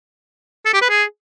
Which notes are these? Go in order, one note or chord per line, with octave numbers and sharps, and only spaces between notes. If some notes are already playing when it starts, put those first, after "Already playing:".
A4
G4
B4
G#4